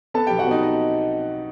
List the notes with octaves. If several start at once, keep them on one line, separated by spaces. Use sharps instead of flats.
B3 A4 A5
G4 G5
B1
F#4 F#5
B3 D#4 D#5
D#4 D#5